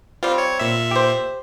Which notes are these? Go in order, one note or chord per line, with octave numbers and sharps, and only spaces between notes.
G3 C4 F4
C#5
A#2 E5
G4 C5